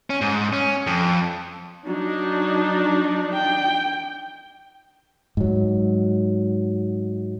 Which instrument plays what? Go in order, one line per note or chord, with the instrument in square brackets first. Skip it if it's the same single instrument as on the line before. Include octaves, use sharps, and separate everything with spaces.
[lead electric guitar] C#4
G#2
C#4
F2
[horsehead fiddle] F#3 [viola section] D4 D#4
[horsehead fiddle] G5
[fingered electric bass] G#2 F#3